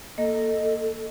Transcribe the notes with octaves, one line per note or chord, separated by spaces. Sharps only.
A#3 A4 D#5